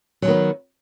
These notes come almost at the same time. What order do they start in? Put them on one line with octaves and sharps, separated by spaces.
F#3 F3 D#3 B3